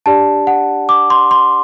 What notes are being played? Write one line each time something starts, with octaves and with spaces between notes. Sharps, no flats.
D4 G4 D5 A5
F#5
D6
C6
C6